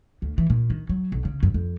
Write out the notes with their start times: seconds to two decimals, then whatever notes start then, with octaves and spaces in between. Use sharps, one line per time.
0.22 D2
0.38 E3
0.50 A#2
0.70 D#3
0.89 F#3
1.12 B1
1.25 C#3
1.43 F#2
1.54 F2